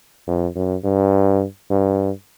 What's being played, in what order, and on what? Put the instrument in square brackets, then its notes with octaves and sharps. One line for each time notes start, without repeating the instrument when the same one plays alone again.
[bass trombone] F2
F#2
G2
G2